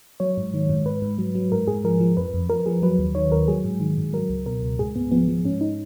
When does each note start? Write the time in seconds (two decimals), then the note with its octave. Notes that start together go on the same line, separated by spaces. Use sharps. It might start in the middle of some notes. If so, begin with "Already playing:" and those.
0.20 F#3 C#5
0.37 G#2
0.54 D#3
0.69 G#2
0.86 G#2 B4
1.02 G#2
1.18 F#3
1.35 F#3
1.52 G#2 A#4
1.67 G#2 G#4
1.84 F3 A#4
2.00 F3
2.17 F2 B4
2.34 F2
2.49 F3 A#4
2.66 F3 G#4
2.82 F#3 B4
2.99 D#2
3.15 D#3 C#5
3.32 D#2 A#4
3.48 F#3 G#4
3.64 G#2
3.80 D#3
3.97 G#2
4.13 F#3 A#4
4.29 C#2
4.46 B2 A#4
4.63 C#2
4.79 G#2 G#4
4.95 G#2 B3
5.11 F3 B3
5.28 F3
5.45 G#2 C#4
5.61 D#4